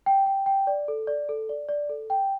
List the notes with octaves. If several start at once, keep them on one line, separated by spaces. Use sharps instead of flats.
G5
G5
G5
D5
A4
D5
A4
D5
D5
A4
G5